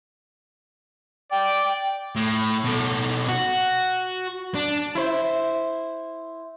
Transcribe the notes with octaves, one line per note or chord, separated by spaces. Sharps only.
D5 G5
A2
B2 A4
F#4
D4
E4 C5